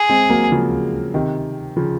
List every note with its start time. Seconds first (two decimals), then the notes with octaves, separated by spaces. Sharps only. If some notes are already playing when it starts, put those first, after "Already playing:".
Already playing: G#4
0.09 G#3 C4
0.30 F#3 A#3
0.52 C#3 F3
1.14 C3 D#3
1.77 C#3 F3